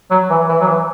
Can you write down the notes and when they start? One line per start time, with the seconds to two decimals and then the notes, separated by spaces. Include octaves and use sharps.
0.11 F#3
0.30 E3
0.49 E3
0.61 F#3
0.68 E3